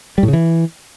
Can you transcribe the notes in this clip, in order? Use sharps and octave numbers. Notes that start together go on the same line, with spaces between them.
G3
A2
C#3
E3